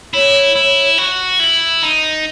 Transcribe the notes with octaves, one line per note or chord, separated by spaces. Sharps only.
E4 C#5
E4
F#4
E4
D#4